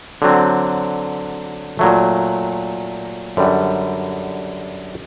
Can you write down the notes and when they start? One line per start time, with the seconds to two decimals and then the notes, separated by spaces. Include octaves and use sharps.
0.22 D3 F#3 C4
1.79 A#2 F#3 A3
3.37 F#2 D3 G3